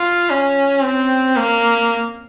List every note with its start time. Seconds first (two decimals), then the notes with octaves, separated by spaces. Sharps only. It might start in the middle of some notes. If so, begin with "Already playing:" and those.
Already playing: F4
0.30 C#4
0.84 C4
1.37 A#3